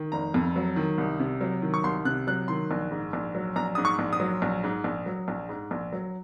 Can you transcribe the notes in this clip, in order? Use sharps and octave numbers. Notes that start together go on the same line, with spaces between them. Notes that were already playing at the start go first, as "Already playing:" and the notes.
Already playing: D#3
F1 A#5
F2
F#3
D#3
C2
C3
F#3
D#3
C#6
C2 C6
C3 F#6
F#3 F#6
D#3 C6
A#1
G#2
A#1
F#3
A#1 A#5
G#2 D#6
C#6
A#1
D#6
F#3
A#1
G#2
A#1
F#3
A#1
G#2
A#1
F#3